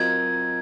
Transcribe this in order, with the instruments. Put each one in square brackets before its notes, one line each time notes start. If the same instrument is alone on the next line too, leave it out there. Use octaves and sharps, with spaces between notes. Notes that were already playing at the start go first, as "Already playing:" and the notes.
Already playing: [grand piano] F#3 C4 F4 A#4 D#5 [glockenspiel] G#6